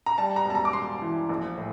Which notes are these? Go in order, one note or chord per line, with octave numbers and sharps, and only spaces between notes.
A#5
G3 A5
A#5
E1 A5
A#5
D6
E1 C6
E3
A#1
A2